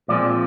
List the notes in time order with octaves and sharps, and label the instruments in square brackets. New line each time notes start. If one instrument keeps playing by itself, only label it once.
[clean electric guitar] A#2 F3 G#3 C4 D5